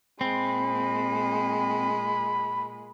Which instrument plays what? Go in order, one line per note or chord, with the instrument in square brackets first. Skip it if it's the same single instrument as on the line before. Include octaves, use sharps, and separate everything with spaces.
[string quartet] A#2 G#3 [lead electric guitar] C4 [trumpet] B5